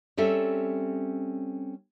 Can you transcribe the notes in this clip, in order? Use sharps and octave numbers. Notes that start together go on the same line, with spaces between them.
G3 C4 C#4 A4 E5